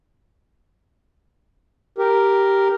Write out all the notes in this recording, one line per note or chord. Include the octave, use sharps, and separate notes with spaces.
G4 A#4